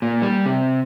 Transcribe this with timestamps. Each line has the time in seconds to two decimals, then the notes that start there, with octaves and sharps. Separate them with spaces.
0.02 A#2
0.22 G3
0.46 C3